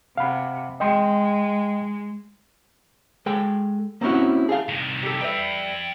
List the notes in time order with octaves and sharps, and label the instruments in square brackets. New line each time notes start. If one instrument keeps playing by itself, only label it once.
[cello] C3 [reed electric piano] F5 F#5 B5
[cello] G#3 [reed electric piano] D#5 G5 C6
[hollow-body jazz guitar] G#3 A4 G5
A#3 C4 C#4 E4 F#4
G#4 A4 F5
[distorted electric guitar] C2 D#3
[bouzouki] G4 A4
[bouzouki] G3 B4 E5 [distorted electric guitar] F5 G5